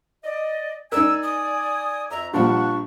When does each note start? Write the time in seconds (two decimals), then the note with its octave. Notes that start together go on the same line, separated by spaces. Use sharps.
0.24 D5 D#5
0.92 D#4 A#4 D5 G#5 E6
1.23 D#6
2.11 F2 E5 A#5
2.33 A#1 F3 G3 D4 F#5 C#6